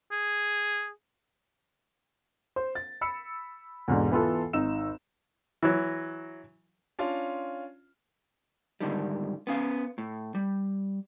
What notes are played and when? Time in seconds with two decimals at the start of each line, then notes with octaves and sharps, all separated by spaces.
0.12 G#4
2.56 C5
2.75 A6
3.01 B5 E6 C#7
3.88 E2 G#2 B2 D3
4.11 E3 B3 F4 A4
4.53 G#1 D#4 E6 E7
5.63 E3 F#3
6.99 C#4 D4 F4
8.80 G#2 D3 D#3 G3
9.47 B3 C#4 F5
9.98 A2
10.35 G3